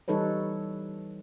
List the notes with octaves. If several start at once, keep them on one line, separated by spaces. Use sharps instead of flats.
E3 G3 D#4 A4 B4 C#5